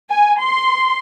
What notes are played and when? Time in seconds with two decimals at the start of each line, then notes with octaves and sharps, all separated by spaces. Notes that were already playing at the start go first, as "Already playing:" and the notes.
0.10 G#5
0.42 C6